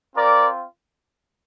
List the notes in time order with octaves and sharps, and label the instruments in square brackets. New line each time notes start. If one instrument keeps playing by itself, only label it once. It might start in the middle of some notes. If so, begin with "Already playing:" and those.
[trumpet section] C4 F4 A#4 D5